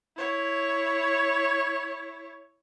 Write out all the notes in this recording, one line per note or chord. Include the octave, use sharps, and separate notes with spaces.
E4 C#5